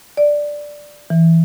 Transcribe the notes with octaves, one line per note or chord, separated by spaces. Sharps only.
D5
E3